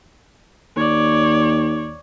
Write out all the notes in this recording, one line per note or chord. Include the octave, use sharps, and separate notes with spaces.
D#2 C#5 D5